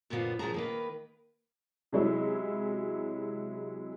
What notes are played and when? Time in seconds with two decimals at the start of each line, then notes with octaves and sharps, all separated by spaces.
0.10 F#2 A#2 D3 E3 F3 B3
0.39 F#2 F3 G#4 A5 A#5
0.54 D#3 A#3 B4
1.92 C3 F#3 G#3 C#4 E4